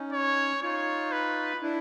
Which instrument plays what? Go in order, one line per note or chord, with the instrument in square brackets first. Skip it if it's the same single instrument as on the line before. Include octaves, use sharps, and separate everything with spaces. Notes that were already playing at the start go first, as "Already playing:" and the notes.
Already playing: [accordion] C#4 D#4
[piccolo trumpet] C#5
[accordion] D#4 F4 [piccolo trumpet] C#5
[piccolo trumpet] B4
[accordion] D4 E4